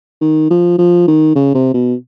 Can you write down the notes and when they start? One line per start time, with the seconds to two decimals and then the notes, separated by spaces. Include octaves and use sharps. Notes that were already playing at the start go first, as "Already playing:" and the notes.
0.21 D#3
0.50 F3
0.79 F3
1.08 D#3
1.36 C#3
1.55 C3
1.74 B2